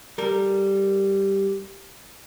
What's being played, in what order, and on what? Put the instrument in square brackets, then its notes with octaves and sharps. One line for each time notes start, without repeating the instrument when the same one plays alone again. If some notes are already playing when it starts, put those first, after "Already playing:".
[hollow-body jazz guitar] G3 A4 A#4